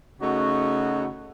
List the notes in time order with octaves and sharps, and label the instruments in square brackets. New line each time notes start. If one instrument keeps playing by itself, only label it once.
[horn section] C#3 A3 D#4 F#4